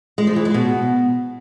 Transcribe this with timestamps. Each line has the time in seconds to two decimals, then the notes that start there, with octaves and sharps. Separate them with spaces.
0.18 G#3
0.27 F3
0.36 E3
0.45 G#3
0.54 B2